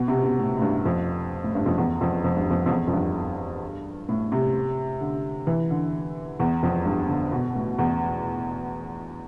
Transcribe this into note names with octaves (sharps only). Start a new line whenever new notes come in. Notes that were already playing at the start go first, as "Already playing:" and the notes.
Already playing: B2
C3
B2
A2
A2
G2
F2
A2
G2
F2
E2
F2
F2
G2
F2
F2
E2
F2
G2
A2
C3
D3
E3
D3
E2
F2
G2
D3
B2
A2
E2